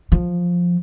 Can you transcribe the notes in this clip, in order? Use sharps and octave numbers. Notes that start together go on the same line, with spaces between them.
F3